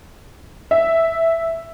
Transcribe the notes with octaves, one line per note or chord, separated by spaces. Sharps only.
E5